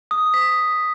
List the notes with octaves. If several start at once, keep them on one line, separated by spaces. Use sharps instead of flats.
D#6
B6